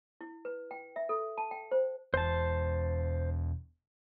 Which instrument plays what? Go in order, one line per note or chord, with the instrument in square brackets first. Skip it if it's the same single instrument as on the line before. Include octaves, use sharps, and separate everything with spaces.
[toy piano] E4
B4
G5
E5
A4
A5
G5
C5
[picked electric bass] E1 E2 [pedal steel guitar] C5 A5